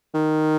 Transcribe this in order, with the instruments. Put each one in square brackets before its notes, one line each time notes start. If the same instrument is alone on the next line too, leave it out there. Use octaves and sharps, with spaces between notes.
[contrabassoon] D#3